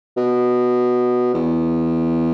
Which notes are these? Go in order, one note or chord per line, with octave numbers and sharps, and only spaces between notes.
B2
E2